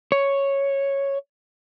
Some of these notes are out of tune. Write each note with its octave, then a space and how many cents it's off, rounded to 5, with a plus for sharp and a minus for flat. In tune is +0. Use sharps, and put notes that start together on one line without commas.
C#5 -5